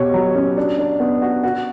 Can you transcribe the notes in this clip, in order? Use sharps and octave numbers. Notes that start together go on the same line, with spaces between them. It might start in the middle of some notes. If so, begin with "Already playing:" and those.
Already playing: B2 G4 C#5
F#3
C#4
D4
D4
B3
F#4
F#4